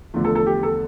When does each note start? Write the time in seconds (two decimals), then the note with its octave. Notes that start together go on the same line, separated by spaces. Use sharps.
0.14 E2 D3 F3 A3
0.24 A4
0.35 A4
0.46 G4
0.63 A4